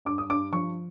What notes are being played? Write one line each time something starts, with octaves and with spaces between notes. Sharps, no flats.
G2 D6
D#6
G2 D6
F3 C#6